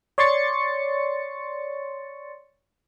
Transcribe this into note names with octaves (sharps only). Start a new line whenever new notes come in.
C#5 D5 C6 C#6 A6 C#7